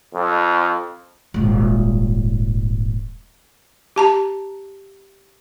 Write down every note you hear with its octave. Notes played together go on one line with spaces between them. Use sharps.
F2
D#1 G#1
G4 A5 A#5